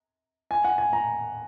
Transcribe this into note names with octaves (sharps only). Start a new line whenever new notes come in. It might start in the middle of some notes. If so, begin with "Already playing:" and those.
G#5
F#5
G#5
A#5